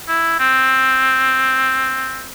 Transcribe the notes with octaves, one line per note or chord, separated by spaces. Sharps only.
E4
C4